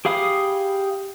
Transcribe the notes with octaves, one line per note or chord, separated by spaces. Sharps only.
G4 G#4 F5 B5 D#6